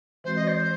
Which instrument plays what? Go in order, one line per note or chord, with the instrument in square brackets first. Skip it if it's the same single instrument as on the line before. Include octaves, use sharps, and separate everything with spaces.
[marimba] E3 G#3 C4 F#4 [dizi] C5
[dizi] D#5
C5